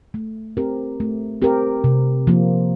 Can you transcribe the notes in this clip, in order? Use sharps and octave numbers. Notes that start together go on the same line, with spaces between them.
A3
C4 G4 A#4
A3
C4 G4 A#4
C3
F3 A#3